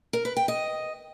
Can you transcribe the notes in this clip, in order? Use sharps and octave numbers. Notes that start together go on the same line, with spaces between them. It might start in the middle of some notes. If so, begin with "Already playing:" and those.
A#4
B4
G5
D#5